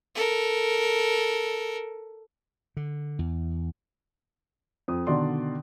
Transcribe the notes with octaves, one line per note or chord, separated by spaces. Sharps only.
A4 A#4
D3
E2
F2 D#6
B2 D3 D#3 D5 C6